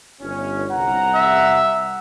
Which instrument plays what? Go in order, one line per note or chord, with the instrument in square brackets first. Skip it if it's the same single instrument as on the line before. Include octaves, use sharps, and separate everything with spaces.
[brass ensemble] G1 C#4
C2 F#5 A#5
[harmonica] E5 E6